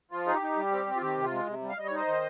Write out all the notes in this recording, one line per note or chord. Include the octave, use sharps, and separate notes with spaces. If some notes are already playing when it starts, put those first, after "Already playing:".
F3 F4
D#4 G#4
G4
D#4
G3
C4
C4
F4
D#3 G4
C3
F4
G#3
C3
G3
F5
G3 D#5
C#5
D#4 C5 D#5
D#3